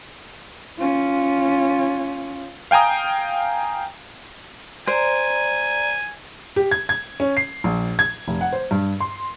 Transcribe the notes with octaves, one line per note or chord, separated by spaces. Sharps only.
C#4 F4
F5 G5 G#5 A#5 D#6
C5 D5 G#5 A#5
G4
G#6
G#6
C#4
C7
A#1
G#6
F1
F#5
C5
G2
C6